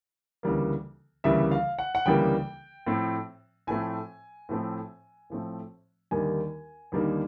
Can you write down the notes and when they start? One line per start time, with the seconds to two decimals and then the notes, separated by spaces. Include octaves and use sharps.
0.43 D2 C#3 E3 G3 A#3
1.24 D2 C#3 E3 G3 A#3 E5
1.51 F5
1.79 F#5
1.95 F#5
2.06 D2 C#3 E3 G3 A#3 G5
2.87 A2 F3 A3 C4
3.67 A2 F3 A3 C4 G#5
4.49 A2 F3 A3 C4
5.30 A2 F3 A3 C4
6.11 D#2 D3 G3 A#3 D#4 G#5
6.92 D#2 D3 G3 A#3 D#4